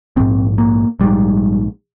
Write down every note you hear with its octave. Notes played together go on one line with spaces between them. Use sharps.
A#1 G#2 C4
A#3
A#1 G#2 G3